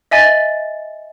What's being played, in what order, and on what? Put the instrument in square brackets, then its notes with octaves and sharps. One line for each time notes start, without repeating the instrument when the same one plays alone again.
[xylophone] D#5 E5 G#5 A6